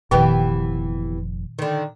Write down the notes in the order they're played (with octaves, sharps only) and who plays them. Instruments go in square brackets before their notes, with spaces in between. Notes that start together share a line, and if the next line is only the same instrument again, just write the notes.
[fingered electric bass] F1 F2 [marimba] A#2 D#3 [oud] E3 B3 G4
[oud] D3 D#3